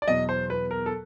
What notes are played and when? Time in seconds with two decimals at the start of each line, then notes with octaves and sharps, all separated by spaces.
0.02 D5
0.08 E2 B2 F#3 D#5
0.29 C5
0.50 B4
0.71 A#4
0.86 A4